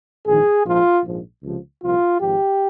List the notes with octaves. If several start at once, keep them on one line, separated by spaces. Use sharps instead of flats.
A#1 G#2 D#3 G#4
A#1 G#2 F3 F4
A#1 G#2 F3
C#2 C3 F3
C2 A#2 F3 F4
G#1 G#2 F3 G4